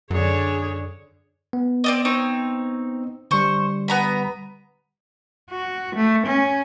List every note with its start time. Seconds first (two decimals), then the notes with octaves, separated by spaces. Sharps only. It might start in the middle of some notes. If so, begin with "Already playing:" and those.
0.11 F#2 D3 D4 G#4 C#5
1.53 B3
1.84 C4 D5 D#5
2.05 C4 D#4 C#5
3.31 D3 G3 C5 C#6
3.88 B3 A#5 B5
5.50 F#4
5.96 A3
6.27 C#4